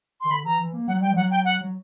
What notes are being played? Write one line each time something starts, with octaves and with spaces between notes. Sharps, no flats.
D#3 C6
D3 B5
E3 A#5
E3
A#3
F#3 F#5
G3 G5
F3
F#3 F#5
G5
F#5
F#3